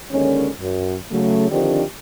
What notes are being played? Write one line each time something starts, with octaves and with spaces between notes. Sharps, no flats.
D#2 D3 D#3 G#3 C#4
F#2
C#3 F#3 A3
D3 D#3 F3 C4 D4 G4